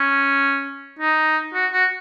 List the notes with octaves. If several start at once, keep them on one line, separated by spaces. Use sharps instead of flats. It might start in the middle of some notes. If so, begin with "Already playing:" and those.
Already playing: C#4
D#4
F#4
F#4